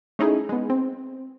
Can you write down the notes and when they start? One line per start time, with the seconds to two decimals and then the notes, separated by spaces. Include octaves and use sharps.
0.19 A3 C#4 D#4 E4 G#4
0.49 G#3 B3
0.70 C4